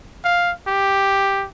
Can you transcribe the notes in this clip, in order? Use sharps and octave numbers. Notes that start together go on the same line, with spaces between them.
F5
G4